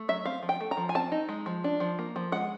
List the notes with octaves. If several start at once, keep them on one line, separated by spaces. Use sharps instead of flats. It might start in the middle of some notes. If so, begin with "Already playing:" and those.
Already playing: A3
F#3 E5
C4 F5
F3
G5
A3
A#5
F3
G#5
C4 A5
D#4
G#3
F3
D4
F3
A#3
F3
G#3 F#5